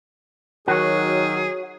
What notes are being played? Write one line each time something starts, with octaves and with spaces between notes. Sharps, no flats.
D#3 F#3 F#4 G#4 C#5